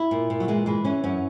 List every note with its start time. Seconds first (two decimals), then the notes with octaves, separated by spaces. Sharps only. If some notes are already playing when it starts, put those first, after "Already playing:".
Already playing: E4
0.11 A#2
0.30 A#2
0.40 F#3
0.48 E3 G#3
0.66 E3 G#3
0.84 E3 C#4
1.04 F#2 C#4